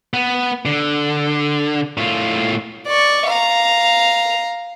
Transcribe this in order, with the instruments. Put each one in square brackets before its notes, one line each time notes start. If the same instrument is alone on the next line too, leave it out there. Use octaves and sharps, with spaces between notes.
[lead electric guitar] B3
D3
A2 F4
[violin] D5 C#6
F5 A#5